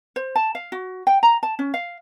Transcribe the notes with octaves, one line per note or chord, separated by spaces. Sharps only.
C5
A5
F5
F#4
G5
A#5
A5
C#4
F5